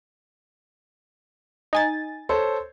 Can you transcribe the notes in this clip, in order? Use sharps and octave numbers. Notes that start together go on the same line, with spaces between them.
D#4 G#5 A6
A4 C5 C#5